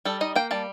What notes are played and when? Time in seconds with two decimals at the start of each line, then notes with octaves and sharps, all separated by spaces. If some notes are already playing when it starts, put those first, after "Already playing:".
0.05 G3 A4
0.21 D#4 D#5
0.36 A#3 G5
0.51 G3 A5